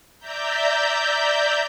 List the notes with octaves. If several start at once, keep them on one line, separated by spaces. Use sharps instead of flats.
D5 E5 A#5 G6